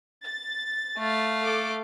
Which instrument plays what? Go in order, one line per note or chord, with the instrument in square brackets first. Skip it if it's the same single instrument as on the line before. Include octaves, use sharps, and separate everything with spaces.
[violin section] A6
[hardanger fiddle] A3 F5
[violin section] A4 D6